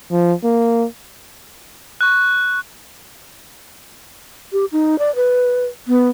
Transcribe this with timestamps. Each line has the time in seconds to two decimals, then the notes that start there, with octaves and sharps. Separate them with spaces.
0.11 F3
0.44 A#3
2.01 C#6 F#6
4.52 G4
4.72 D#4
4.99 D5
5.16 B4
5.88 B3